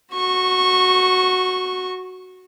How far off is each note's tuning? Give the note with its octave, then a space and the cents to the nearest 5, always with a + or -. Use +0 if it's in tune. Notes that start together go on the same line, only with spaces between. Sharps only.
F#4 +0 C#6 -20